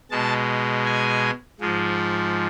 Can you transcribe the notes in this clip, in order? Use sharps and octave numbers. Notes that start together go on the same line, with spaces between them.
B2 G#3 A5
G#5
G#2 F3 G#3